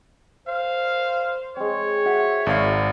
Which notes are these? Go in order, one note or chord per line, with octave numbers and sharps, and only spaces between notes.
C5 F5
G#3 C4 C#5
F#4 E5
G#1 F5